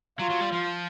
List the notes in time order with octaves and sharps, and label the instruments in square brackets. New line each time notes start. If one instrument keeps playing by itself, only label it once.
[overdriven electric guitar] F#3 [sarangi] F4
[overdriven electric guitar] F#3
G3
F3